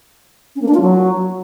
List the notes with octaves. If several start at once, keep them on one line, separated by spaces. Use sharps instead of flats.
C#4
A#3
D4
F4
F#3